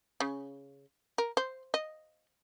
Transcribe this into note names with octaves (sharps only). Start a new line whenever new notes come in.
C#3
A#4
C5
D#5